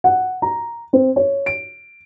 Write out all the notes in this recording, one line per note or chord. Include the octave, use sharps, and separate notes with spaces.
F#5
A#5
C4
C#5
D7